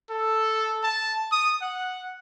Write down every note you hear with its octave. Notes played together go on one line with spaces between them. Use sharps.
A4
A5
D#6
F#5